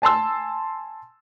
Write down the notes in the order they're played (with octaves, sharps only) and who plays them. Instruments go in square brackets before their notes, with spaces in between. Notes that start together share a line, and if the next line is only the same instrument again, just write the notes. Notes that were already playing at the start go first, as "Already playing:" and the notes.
[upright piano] G#5 A5 C6 E6